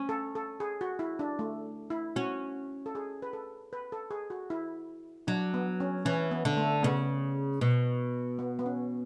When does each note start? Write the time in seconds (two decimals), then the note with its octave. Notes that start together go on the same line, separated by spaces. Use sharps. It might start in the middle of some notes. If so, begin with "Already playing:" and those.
Already playing: C#4
0.09 A4
0.35 A4
0.60 G#4
0.81 F#4
0.99 E4
1.19 D4
1.39 A3
1.90 E4
2.16 C#4 F#4
2.86 A4
2.95 G#4
3.22 B4
3.33 A4
3.73 B4
3.92 A4
4.11 G#4
4.30 F#4
4.50 E4
5.27 F#3 D4
5.54 B3
5.80 C#4
6.05 E3 C#4
6.31 B3
6.45 D3
6.57 A3
6.83 C#3 B3
7.61 B2
8.39 B3
8.59 B3
8.66 C#4